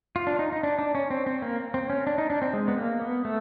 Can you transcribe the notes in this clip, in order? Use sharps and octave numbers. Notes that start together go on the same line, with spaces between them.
F4
D4
D#4
D#4
D4
D4
C#4
C4
C4
A#3
C4
C#4
D4
D#4
D4
C4
G#3
B3
A#3
B3
A3